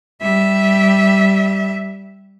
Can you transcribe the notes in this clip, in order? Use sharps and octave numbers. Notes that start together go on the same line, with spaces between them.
G3 E5